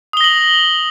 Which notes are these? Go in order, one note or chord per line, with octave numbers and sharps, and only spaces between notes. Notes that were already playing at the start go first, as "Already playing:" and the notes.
D#6 A#6 F#7 G7